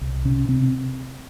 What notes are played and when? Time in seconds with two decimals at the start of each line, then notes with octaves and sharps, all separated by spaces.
0.01 C2
0.25 C3 C#4
0.48 C3 C4